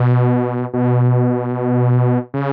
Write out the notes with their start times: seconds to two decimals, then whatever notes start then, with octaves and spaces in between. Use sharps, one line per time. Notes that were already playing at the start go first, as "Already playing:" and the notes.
Already playing: B2
0.74 B2
2.34 C#3